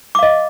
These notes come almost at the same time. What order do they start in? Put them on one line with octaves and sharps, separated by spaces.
D6 F5 D#5